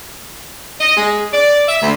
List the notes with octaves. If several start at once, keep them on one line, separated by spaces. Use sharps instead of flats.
D#5
G#3
D5
E5
D2